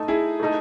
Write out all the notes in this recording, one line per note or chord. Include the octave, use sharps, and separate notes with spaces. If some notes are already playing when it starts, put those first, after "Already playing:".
Already playing: A3 D#4 A4
E4 G#4
A3 D#4 A4